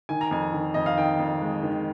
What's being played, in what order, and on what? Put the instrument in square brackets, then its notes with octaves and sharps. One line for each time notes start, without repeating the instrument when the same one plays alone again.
[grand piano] D#3 G#5
A#5
F2 G#5
D#3
F2 D#5
F5
D#3 G5
F2
G#3
D#3